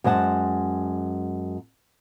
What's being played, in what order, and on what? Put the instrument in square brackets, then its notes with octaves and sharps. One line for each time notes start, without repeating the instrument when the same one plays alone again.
[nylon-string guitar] F#2 G#3 C5 F#5 A5